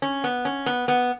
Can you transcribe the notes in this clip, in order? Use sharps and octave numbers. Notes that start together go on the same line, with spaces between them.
C#4
B3
C#4
B3
B3